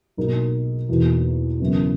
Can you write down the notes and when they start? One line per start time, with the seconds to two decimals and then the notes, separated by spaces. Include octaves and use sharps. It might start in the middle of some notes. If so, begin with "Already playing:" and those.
0.17 B1 B2 A#3 D#4 A#4
0.89 E2 B2 A#3 D#4
1.60 F#1 F#2 E3 B3